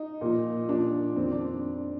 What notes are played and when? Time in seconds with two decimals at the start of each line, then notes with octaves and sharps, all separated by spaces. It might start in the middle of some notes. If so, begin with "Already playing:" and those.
Already playing: D#4
0.21 A#2 F3
0.69 A#2 F3 D4
1.15 F2 D#3 C4
1.32 D4